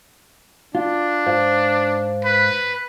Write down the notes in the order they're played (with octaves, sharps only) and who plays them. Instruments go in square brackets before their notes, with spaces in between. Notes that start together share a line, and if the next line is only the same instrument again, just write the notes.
[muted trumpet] D4 [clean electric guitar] F4
[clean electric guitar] G#2 C5 F5
[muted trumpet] B4